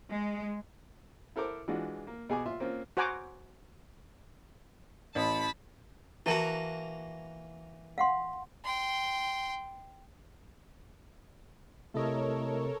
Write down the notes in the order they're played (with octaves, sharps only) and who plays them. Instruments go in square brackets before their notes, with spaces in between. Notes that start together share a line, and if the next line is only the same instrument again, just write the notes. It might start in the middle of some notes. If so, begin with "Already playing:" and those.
[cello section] G#3
[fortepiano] E4 A4 A#4 C5 D6
E3 G#3 D4 F4 F#4
A#3
B2 G#4 G#5 D6
F4 E5 C6
A#3 C4 C#4 F4
[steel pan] F#4 C5 F#5 G#5 A#5 D6
[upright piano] A1 [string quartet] A5 B5
[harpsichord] E3 A#3 F#4 [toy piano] E4 A5
[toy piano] F5 F#5 C6
[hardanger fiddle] G5 C6
[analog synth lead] C3 [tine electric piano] A3 E4 D#5 [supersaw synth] A4 A#4 C#5